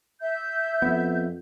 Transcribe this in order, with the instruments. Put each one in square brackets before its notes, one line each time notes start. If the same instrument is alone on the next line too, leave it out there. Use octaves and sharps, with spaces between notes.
[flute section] E5 G6
[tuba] F2 [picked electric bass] B3